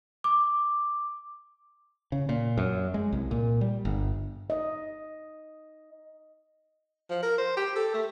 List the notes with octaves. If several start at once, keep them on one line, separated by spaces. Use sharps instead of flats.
D6
C#3
A#2
F#2
G#3
C2
A#2
G3
G1
D#5
F3
A#4
C5
G4
A4
A3